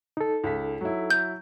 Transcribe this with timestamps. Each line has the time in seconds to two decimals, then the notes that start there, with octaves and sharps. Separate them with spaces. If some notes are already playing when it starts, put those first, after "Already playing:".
0.17 D#4 A4
0.44 C#2 B6
0.81 F#3 E4
1.10 G6